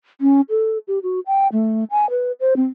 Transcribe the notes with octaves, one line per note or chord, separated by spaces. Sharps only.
C#4
A4
G4
F#4
G5
A3
G#5
B4
C5
C4